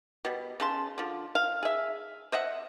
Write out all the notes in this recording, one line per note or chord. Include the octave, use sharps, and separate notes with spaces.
B2 G3
C#3 A5 C6
D3 F3
F5
G#4 E5
C5 D#5 E5 F#5